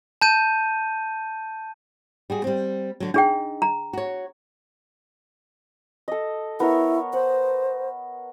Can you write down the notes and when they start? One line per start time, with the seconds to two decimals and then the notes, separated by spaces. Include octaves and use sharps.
0.21 A5 G6 D#7
2.30 G3 F#4 G#4
2.44 G3 C4
3.00 D3 F#3
3.14 D4 D#4 G#4 G5
3.62 A#5
3.93 F#4 C#5
6.08 A4 D#5
6.60 B3 E4 A#4 C#5
7.13 C5 F#5